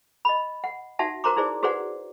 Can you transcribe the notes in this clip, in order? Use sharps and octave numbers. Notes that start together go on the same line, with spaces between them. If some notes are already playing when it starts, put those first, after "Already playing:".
D#5 B5
F#5
D#4 F#4 E5 F#5 A5
F#4 A#4 C5 A#5 C6 D6
D#4 E4 G#4 C5 D5
F#4 G#4 B4 C5 D5 F#5